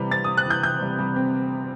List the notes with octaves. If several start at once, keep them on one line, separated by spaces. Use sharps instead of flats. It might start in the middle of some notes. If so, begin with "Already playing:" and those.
Already playing: C3 E3 G3
C4 A6
D#6
C4
F#6
E3 G6
E3 G6
G3
G3
C4